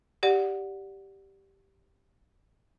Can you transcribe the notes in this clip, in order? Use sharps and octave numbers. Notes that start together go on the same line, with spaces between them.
G4 D5 F#5